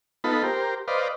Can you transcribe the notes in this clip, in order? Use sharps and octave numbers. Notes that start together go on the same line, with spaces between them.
B3 D#4 F4 A4 B5
G4 A#4 C5
B4 C5 D5 D#5 F5